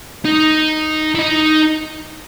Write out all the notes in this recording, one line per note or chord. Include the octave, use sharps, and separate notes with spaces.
D#4
E4
D#4